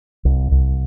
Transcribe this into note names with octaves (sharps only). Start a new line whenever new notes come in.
C2
C2